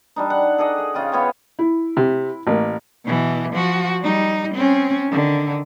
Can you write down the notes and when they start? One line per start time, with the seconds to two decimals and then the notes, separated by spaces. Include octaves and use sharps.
0.16 G3 D4 D#4
0.30 F#5
0.58 G#4 A4 D5 D#5
0.78 G#4
0.94 C#3 F4 D#5 G5
1.12 B3 C#5 G5 C#6
1.59 E4
1.97 C3
2.47 A1 A#3
3.06 B2 E3
3.53 F3 F#4
4.01 G3 D#4
4.54 C4 C#4
5.09 D3 D#3